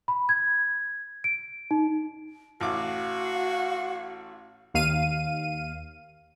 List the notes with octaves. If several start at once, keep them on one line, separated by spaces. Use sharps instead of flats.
B5
G#6
D7
D#4
A1 F#4 F5 D6
D#2 F5 D#7